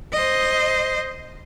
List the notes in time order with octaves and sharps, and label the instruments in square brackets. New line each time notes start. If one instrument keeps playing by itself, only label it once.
[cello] C5 D#5